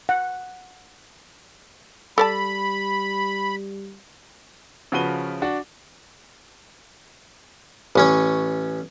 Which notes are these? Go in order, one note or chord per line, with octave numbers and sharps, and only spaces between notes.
F#5
G3 A4 D5 A5 B5
C#3 F3 F#4 B4 D#7 G7
D4 F#4
A1 C#4 C#5